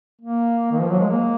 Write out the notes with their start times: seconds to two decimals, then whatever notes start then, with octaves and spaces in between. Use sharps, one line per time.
0.21 A#3
0.72 D#3
0.81 F3
0.90 F#3
0.99 G#3
1.09 A#3